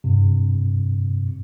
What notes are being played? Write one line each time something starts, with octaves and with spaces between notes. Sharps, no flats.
G2 C3